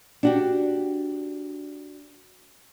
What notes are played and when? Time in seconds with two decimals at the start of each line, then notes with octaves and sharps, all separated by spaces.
0.23 D4 F#4 G4